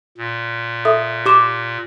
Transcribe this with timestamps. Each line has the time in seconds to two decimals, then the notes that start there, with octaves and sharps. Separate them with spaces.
0.18 A#2
0.85 A4 E5 D#6
1.26 G4 D6 E7